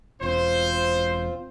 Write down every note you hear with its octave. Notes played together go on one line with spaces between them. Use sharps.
E1 C4 F4 C5